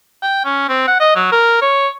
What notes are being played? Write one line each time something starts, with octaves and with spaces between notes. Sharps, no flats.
G5
C#4
C4
F#5
D#5
F#3
A#4
C#5